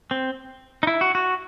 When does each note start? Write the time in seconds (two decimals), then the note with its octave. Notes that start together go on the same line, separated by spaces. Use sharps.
0.11 C4
0.83 D#4
0.87 E4
1.01 F#4
1.15 F#4